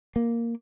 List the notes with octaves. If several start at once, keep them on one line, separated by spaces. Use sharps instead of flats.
A#3